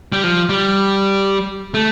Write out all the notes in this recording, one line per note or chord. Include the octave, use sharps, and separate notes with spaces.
G3
F3
G3
A3